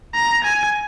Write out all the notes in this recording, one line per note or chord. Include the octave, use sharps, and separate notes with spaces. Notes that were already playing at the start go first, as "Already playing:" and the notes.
A#5
G#5